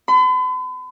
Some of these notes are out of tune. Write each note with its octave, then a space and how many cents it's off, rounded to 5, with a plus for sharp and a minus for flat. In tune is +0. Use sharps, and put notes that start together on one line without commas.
B5 +45